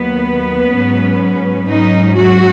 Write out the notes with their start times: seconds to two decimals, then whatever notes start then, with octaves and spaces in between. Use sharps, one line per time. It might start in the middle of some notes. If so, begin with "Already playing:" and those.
Already playing: D#2 D#3 F#3 B3 B4
0.70 G#2 F#3 C#4
1.67 G#2 F#3 C#4 D#4
2.16 F#3 F#4